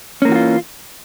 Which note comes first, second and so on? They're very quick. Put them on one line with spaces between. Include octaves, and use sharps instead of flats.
C#4 A#3 E3 F#4 F4